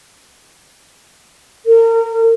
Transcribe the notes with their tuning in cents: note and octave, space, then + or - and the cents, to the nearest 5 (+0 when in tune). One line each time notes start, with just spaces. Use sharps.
A#4 -30